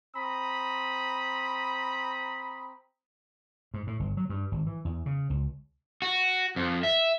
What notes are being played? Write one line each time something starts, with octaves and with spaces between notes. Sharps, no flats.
C4 A#5 B5 D#6
G#2
A2
G1
F#3
G2
G#1
E3
E2
C#3
C#2
F#4
F2
E5